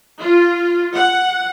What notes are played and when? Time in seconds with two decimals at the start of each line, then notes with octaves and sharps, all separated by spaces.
0.21 F4
0.94 F#5